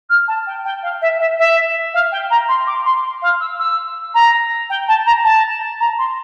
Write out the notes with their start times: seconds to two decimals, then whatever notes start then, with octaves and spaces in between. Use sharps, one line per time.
0.09 F6
0.28 A5
0.47 G5
0.65 G5
0.83 F5
1.02 E5
1.20 E5
1.38 E5
1.94 F5
2.12 G5
2.30 A#5
2.48 C6
2.67 D6
2.85 C6
3.04 C6
3.22 F5
3.40 E6
3.59 E6
4.14 A#5
4.70 G5
4.88 A5
5.06 A#5
5.24 A5
5.80 A#5
5.98 C6